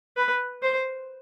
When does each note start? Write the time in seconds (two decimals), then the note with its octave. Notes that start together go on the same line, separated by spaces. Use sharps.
0.17 B4
0.63 C5